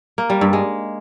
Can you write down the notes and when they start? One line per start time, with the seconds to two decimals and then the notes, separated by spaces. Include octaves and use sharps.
0.18 A#3
0.30 G3
0.41 G2
0.53 G#3